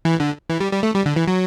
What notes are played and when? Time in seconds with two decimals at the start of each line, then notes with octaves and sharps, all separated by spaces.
0.05 E3
0.20 D3
0.50 E3
0.60 G3
0.72 G3
0.83 A3
0.94 G3
1.06 D3
1.16 E3
1.28 F#3